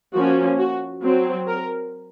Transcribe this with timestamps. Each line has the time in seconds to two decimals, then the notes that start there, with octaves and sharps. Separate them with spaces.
0.14 F3 A#3 C#4 F#4
0.58 F#4
1.03 F#3 C4
1.47 A#4